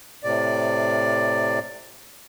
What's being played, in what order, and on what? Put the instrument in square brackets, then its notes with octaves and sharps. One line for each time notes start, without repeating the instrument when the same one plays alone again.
[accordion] A2 C3 D5